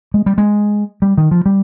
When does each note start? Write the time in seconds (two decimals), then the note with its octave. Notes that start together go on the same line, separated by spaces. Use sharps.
0.14 G#3
0.26 G3
0.38 G#3
1.02 G3
1.18 D#3
1.31 F3
1.46 G3